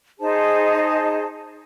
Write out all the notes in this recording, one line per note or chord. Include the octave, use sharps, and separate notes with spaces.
D#4 G#4 C5 A5